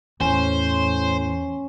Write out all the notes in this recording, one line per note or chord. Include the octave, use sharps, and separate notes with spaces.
E2 A2 C#4 C5